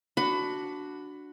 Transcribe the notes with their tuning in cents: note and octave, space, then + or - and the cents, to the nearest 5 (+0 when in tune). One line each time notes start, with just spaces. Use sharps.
D4 +0 F#4 +0 B5 +20